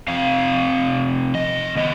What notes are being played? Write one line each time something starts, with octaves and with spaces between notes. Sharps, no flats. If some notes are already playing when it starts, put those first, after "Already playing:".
C3 F3 C4 F5
D#5
D#3 B3 D#5